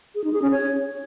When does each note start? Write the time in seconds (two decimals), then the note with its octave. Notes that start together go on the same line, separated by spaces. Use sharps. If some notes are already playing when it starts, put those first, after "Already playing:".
0.15 G#4
0.24 D#4
0.33 G#4
0.42 C#4
0.51 C#5